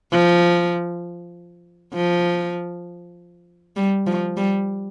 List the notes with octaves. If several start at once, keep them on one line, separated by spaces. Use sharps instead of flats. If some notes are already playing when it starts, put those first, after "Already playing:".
F3
F3
G3
F3
G3